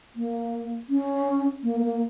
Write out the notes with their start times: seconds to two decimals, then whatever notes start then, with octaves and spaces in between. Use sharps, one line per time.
0.16 A#3
0.89 C#4
1.63 A#3
1.83 A#3